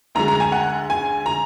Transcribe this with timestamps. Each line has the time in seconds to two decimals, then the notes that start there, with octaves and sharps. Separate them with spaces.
0.15 D2 D3 G#3 A#5
0.28 A#5
0.40 G#5
0.52 F#5
0.90 G#5
1.26 A#5